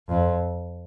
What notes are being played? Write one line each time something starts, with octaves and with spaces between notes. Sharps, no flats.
F2